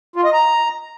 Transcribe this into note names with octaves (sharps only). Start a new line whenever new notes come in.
F4
D#5
A#5